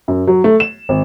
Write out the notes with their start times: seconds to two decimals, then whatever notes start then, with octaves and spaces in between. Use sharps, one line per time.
0.08 F#2
0.27 F#3
0.44 A3
0.60 E7
0.89 G#1